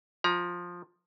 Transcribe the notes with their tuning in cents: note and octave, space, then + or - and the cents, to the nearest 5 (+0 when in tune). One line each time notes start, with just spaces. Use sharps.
F3 +10 A#5 +30